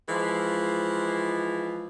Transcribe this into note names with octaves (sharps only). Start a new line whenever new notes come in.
E3 F3 G#3